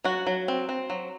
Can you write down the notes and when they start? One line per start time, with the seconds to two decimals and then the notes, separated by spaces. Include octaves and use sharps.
0.04 F#3 F#4
0.27 F#3
0.48 C4
0.69 C4
0.90 F#3